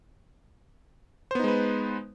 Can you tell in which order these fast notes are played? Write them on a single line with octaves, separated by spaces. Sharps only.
C5 B3 D#4 G#3 B4